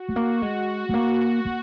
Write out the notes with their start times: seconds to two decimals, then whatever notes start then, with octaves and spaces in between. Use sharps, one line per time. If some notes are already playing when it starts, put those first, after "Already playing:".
Already playing: F#4
0.08 G#3
0.16 A#3
0.41 G#3 F#4
0.89 G#3
0.94 A#3
1.45 A#3